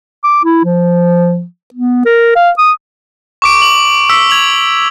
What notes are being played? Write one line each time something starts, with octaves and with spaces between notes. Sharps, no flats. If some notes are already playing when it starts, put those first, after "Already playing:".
D6
E4
F3
B3
A#4
F5
D#6
C#6 D6 D7
F#7
E6 B6
G#6 F7 F#7